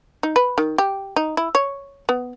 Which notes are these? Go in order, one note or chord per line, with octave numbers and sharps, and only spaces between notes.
D#4
B4
D#3
G4
D#4
E4
C#5
B3